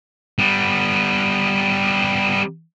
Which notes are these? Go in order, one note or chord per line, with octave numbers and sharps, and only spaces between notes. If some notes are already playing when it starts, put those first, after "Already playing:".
G3 B3